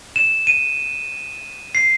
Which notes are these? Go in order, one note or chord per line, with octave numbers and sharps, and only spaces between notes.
E7
D#7
C7